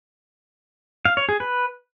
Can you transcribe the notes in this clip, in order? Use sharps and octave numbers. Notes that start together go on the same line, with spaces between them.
F5
C#5
G#4
B4